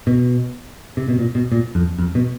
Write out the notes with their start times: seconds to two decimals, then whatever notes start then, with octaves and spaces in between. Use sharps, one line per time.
0.07 B2
0.97 C3
1.08 B2
1.19 A#2
1.35 B2
1.52 A#2
1.75 F2
1.99 F2
2.15 B2